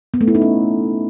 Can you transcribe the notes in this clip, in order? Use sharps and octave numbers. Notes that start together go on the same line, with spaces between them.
B3
A3
E4
D#4
C#4